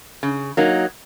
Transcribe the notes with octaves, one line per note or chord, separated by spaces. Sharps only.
C#3
F#3 A#3 D#4